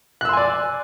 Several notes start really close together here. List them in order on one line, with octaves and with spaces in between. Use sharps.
F#6 E6 C6 G#5 D5